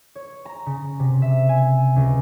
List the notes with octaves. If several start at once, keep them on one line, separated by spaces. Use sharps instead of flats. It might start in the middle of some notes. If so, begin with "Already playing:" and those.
C#5
A#5
C#3
C3
E5
G#5
C#2